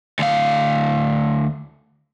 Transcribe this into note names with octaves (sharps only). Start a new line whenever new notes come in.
D2 F5